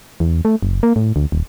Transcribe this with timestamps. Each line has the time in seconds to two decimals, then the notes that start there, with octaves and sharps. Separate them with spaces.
0.20 E2
0.45 A3
0.63 F#1
0.83 A#3
0.96 A2
1.16 D2
1.32 D#1